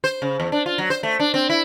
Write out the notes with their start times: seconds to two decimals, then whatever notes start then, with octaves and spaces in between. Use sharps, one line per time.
0.04 C5
0.22 C#3
0.40 E2
0.52 D4
0.66 F4
0.78 F#3
0.90 C5
1.03 A3
1.20 D4
1.34 C4
1.50 E4